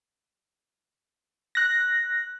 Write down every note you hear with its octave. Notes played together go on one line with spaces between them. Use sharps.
F#6 A#6